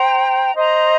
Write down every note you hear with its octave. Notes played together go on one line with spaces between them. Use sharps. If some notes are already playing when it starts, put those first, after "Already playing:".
Already playing: C5 G5 A#5
C5 D#5 A#5